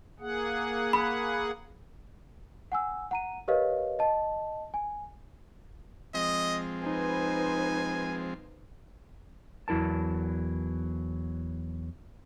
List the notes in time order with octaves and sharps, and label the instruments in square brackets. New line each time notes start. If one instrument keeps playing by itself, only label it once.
[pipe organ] A#3 G#4 F#5
[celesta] B5
F#5 G#5 E6
F#5 A#5 D#7
G4 A#4 B4 C#5 D#5 F5
D#5 A5
G#5
[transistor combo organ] F3 G#3 C4 [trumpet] D#5
[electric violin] D#4 [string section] B4 C5 [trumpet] G#5
[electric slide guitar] E2 F#3 E4 A#4 A5